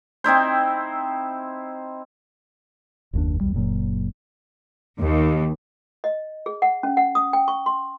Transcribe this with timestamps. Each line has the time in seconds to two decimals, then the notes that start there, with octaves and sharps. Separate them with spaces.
0.24 C4 D#4 E4 C5
3.13 F#1 D#2 D4
3.40 B1 E2 G3
3.54 F#1 A#2 F#3
5.00 D#2
6.04 D#5
6.46 G#4
6.62 F#5
6.83 C#4
6.97 F#5
7.15 D#6
7.33 G5
7.48 C#6
7.66 C6